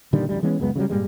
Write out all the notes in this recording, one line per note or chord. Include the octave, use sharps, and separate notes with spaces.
A#2 D3 D#3 G3
A1 D2 G3
E3 G#3 B3 C#4
C#2 F#2 G#3 B3
C#3 E3 F#3 G3
G2 A#2 G3 G#3